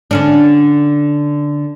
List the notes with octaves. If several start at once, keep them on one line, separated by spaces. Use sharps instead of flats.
D3 C#4 D4